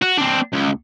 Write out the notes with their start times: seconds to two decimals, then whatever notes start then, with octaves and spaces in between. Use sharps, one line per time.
0.02 F#4
0.18 C4 D4
0.53 C#2